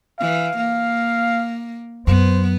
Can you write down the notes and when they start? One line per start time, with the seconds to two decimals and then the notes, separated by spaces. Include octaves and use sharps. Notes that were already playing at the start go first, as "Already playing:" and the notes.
0.20 E3 F5
0.57 A#3
2.07 F#2 B3 C5